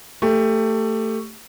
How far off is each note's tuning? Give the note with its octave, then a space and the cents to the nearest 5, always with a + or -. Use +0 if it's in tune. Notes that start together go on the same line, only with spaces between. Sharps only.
A3 +20 G4 +20